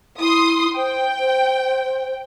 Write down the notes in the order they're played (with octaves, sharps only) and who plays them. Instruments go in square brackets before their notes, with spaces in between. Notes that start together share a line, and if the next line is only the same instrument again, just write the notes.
[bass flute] E4 [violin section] C6 D#6
[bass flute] C5 [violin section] G5
[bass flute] C5